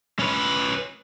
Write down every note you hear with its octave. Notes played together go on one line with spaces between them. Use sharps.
C#4 B4